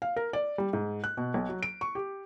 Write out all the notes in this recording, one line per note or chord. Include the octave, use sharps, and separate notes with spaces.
F5
A#4
D5
G3
G#2
F#6
B2
B1
F#3
D7
C#6
G4